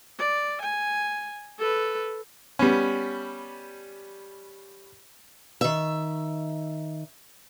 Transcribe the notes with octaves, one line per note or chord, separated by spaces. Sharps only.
D5
G#5
A4 B4
G3 B3 C#4
D#3 E5